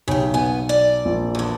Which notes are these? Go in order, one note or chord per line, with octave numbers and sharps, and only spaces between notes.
B1 C#3 G4
B3 G#5
D5
A#1
E2 D3